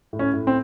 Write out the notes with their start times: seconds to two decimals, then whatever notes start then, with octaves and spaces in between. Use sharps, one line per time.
0.13 A2
0.19 C#4
0.34 A2
0.47 C4